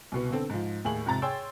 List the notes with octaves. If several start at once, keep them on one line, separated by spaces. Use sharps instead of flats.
C2 B2 B3
D3 B3 C4 A4
G#2 F3
D#2 A2 G#4 F#7
F2 G#2 C3 A#5 A6
G#4 C#5 G5 C6 E6